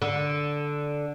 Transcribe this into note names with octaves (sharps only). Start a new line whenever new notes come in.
D3